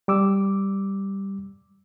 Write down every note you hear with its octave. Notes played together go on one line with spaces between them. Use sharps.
G3 D6 E6